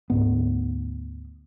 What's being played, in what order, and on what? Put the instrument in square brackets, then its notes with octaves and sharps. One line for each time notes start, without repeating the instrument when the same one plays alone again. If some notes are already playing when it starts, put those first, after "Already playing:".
[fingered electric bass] D2 G#2 B3